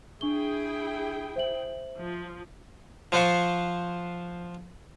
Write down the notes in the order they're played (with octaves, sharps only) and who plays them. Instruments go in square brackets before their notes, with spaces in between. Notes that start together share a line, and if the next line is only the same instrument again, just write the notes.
[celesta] D4 C#6 G7 [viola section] E4 G#4 G5
[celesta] C5 E5 F#7
[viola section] F3
[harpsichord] F3 F4 C5 F#5 C6 C#6